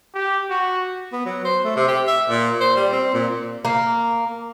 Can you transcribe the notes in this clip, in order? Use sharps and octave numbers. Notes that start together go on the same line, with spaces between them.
G4
F#4
B3
F#3
C5
A3
C3
G4
E5
A#2
C5
G3
C4
A#2
A#3